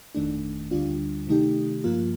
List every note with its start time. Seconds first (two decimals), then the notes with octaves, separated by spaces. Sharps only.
0.15 G1 F2 D#3 A3 D4
0.71 D2 D3 G3 D4 F4
1.27 C3 D#3 A3 D#4 G4
1.84 G2 F3 A#3 F4